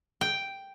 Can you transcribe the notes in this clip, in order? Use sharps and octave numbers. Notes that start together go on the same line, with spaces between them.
G5